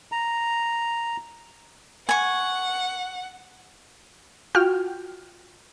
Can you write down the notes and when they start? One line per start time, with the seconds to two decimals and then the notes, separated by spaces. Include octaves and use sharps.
0.12 A#5
2.09 F#5 G#5 C#6
4.55 F4 F#4 G5 F6